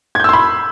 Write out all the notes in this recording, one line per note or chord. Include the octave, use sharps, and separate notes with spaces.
B5 C6 E6 G6 G#6